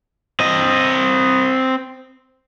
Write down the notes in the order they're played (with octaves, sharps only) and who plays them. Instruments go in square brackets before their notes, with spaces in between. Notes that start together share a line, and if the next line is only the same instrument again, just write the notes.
[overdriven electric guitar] C4 D#5